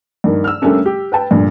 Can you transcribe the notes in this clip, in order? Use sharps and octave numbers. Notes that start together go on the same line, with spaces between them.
G2 D#3 A#3
E6 F6
G3 A3 A#3 C#4 D4
G4
B4 G5 A5
G2 A#2 D3